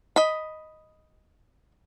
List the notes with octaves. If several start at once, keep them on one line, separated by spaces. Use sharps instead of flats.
D#5 B5